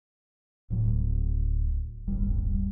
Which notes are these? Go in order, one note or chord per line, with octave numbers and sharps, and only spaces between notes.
D1 A2 F#3
D1 G1 G3